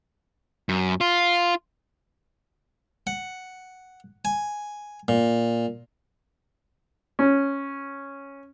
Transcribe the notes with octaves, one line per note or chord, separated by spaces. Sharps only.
F#2
F4
F#5
G#5
A#2
C#4